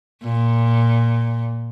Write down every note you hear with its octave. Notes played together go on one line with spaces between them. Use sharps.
A#2